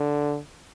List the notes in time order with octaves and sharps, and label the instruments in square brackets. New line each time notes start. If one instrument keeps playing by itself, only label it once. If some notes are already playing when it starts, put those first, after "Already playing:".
Already playing: [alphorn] D3